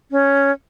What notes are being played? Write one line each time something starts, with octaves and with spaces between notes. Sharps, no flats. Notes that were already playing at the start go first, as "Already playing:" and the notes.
C#4